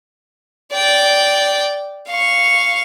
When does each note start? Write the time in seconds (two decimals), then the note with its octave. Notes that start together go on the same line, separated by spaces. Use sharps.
0.72 D5 G5
2.08 F5 C#6